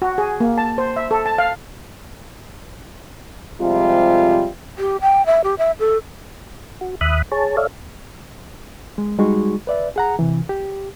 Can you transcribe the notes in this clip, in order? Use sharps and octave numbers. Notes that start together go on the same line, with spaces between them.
F#4
G#4
A#3
A5
C5
E5
A4
A5
F5
C3 F3 G3 G#3 F4
G4
G5
E5
G4
E5
A4
F#4
D#2 E5 B5 D#6 F#6
G#4 C#5 A5
A4 C#5 D5 E5 F5
G#3
G3 G#3 D#4 F#4 G#4 C#6
B4 D5 E5
G#4 F#5 A#5
C3 E3
G4